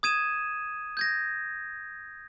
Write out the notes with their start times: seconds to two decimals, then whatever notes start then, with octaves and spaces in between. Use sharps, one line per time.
0.03 D#6 G#6 D#7 E7
0.97 G6 G#6 A#6